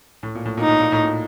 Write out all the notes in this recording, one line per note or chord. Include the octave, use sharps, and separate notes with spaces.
A2
A#2
A2
A#2 D#4
A2
A#2
A2
A#2